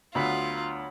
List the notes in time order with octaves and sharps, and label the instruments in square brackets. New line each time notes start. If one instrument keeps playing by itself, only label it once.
[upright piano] D2 B5 B6 [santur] F#3 B3 D#6 [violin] F4